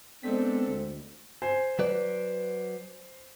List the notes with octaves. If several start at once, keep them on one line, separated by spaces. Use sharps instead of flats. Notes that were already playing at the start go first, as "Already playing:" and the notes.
G#3 B3 C4 D4 A4 C5 B6
D2
C5 G#5
F#3 B4 D5